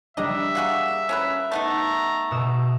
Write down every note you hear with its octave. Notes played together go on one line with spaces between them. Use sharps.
G3 D4 D#5 E5 A#5
A#3 F#4 G#4
C#4 A#4 B4
A3 B3 D#4 A#5
B2 E6 E7